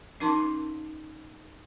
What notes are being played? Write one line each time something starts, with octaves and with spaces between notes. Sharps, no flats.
C#4 D#4 A#4 A5 C6 D6